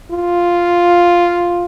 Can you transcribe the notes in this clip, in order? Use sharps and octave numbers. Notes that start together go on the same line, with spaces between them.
F4